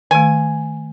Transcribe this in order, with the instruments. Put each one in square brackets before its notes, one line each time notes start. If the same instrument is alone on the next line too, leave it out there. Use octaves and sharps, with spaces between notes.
[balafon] D#3 A3 [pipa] G#5